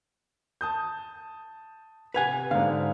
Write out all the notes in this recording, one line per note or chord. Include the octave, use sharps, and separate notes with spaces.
A5 D#6 G6
C3 B4 F#5 G#5 G#6 F7
G#2 D3 F5